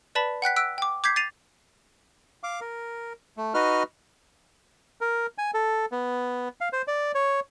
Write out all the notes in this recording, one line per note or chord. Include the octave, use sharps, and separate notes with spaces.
B4 D5 A5 B5 B6
F#5 G5 F#6 B6
E6 F#6 B6 D7
G5 D6
D6 G6 G#6 B6 C7
A6 C7 D#7 F7
F5 D6
A#4
A3
D#4 F#4 B4 D#5 F6
A#4
G#5
A4
B3
F5
C5
D5
C#5